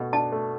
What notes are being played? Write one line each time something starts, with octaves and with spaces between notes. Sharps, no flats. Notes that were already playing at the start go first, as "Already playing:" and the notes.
Already playing: B2 A3
D4 A5
A3